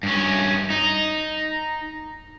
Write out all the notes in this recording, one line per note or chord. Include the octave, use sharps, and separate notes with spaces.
G2 C#4
D#4